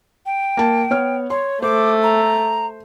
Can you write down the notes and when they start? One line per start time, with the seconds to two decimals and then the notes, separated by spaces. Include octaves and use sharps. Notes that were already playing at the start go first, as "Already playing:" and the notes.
0.26 G5
0.57 A#3 A5
0.90 B3 C#5 F6
1.30 C#5 C6
1.62 A3 C5 D6
2.03 A#5